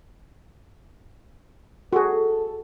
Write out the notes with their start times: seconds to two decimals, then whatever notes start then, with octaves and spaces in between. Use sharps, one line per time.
1.93 F#4 G#4 A4